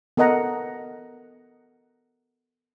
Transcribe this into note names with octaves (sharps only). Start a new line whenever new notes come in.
B3 A4 A#4 D#5 F#5 A#5